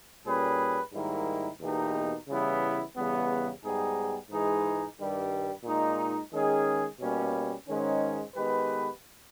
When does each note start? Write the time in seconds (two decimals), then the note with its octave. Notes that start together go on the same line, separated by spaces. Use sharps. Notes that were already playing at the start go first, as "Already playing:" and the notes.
0.25 A#2 G3 C#4 G#4 B4
0.93 G#2 D#3 G3 A#3 E4
1.60 E2 B2 A#3 D#4 G4
2.28 C#3 E3 G3 B3 E4
2.95 E2 C#3 G3 B3
3.62 G#2 G3 B3 D#4 G#4
4.30 G#2 E3 G#3 D#4 G#4
4.97 G2 D#3 G3
5.64 A#2 G#3 D#4
6.31 D#3 G#3 C#4 G#4
6.99 B2 G3 A#3 C#4
7.67 G#2 D#3 G#3 C#4
8.34 D#3 G#3 B3 G4 B4